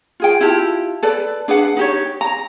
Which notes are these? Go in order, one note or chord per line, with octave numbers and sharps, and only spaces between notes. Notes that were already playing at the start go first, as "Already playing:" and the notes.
F4 G#4 G5
E4 F4 G4 A5
A4 B4 D5
D4 G#4 B4 F#5
D#4 G4 C#5
A#5